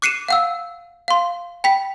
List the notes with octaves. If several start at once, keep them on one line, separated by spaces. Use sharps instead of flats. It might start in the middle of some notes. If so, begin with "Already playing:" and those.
D6 F#6 C7 C#7 D#7 E7
F5 F#5 E6
F5 C6
G5 B5 B6